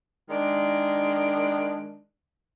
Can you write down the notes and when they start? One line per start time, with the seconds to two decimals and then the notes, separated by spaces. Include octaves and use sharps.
0.29 D#3 G#3 D4